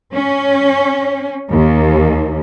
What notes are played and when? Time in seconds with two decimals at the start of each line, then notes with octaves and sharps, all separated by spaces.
0.13 C#4
1.49 D#2